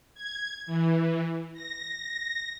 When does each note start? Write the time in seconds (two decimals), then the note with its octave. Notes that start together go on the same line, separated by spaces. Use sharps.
0.15 G#6
0.66 E3
1.54 A#6